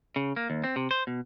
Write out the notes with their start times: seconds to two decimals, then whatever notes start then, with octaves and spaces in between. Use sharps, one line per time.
0.16 C#3
0.36 A#3
0.50 D#2
0.64 C4
0.76 C3
0.91 C5
1.07 B2